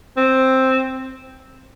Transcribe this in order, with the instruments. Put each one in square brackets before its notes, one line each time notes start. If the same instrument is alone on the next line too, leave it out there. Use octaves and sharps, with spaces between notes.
[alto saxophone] C4